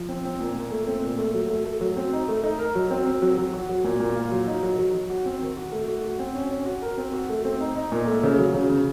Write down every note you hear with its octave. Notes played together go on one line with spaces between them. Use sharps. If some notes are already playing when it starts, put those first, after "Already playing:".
Already playing: F3
C4
C4
A#2
A#2
A3
C4
A#2
A3
F#3
A3
A3
F#3
C4
D#4
A3
D#4
A#4
F#3
C4
C4
F#3
F#3
F#4
F#3
A#2
A#2
F4
F#3
D#4
F#3
F#3
F#3
F#4
C4
D#3
F#4
A3
F#4
F#4
C4
C#4
C#4
F#4
A#4
C4
F#4
A3
C4
D#4
D#4
A#2
A3
C#3
F#3
C#3
C#3